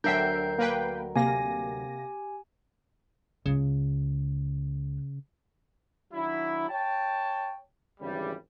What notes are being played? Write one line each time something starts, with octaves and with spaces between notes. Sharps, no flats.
D2 F#3 D4 A#4 E5 G5 G6 C7
A#3 B4 G5
C3 A#3 G4 G#5 A#6
C#2 C#3
D#3 F#3 D4 E4
C#5 G5 A5
G#1 G2 C#3 E3 G3